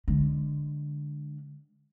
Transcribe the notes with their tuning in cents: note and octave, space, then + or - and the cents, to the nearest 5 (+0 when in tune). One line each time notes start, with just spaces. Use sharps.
D3 +0 G#3 +0